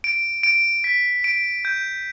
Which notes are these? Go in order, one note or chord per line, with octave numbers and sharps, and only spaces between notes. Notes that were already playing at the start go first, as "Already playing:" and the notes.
D7
D7
B6
D7
G6